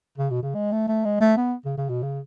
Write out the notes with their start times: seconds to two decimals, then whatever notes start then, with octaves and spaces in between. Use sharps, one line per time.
0.18 C#3
0.30 B2
0.43 C#3
0.55 G#3
0.72 A3
0.88 A3
1.05 G#3
1.20 A3
1.37 B3
1.65 C#3
1.78 C#3
1.89 B2
2.03 C#3